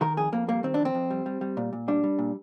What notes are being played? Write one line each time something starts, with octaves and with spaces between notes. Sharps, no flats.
D#3 A#4
F2 G#4
F2 A#3
G3 A#3
D#3 C4
F2 D4
C4
F2
G3
G3
G3
A#2
A#2
G3 D4
G3
A#2